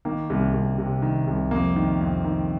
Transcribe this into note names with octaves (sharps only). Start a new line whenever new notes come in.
D#3 A#3
C2
C2
C3
D#3
C2
F2 A#3
D#3
F2
D#3